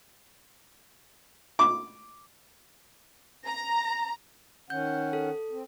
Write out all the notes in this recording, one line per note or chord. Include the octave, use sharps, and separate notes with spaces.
D6
A#5
D#3 C#4 F#5 G6
A4
C4